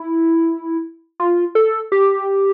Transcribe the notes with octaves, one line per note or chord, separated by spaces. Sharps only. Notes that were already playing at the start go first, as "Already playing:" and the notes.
Already playing: E4
F4
A4
G4